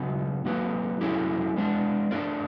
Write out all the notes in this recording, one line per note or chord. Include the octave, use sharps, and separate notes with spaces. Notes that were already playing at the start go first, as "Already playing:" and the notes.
Already playing: C#3 F#3 B3 D#4
F#3 A#3 D#4 G4 B4
F#3 A3 C#4 E4 G4
G#3 B3 D4
A3 D4 F4 A#4 D5